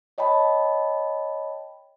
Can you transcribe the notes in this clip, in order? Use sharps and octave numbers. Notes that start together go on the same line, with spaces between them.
C#5 D#5 G5 A5 B5